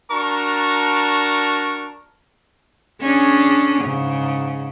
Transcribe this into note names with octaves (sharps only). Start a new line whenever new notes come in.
D4 F#4 A#4 A5 A#5 C#6
C#4 D4 G#4
G#2 C#3